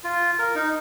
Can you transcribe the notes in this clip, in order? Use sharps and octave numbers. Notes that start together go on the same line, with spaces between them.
F4
A#4
D#4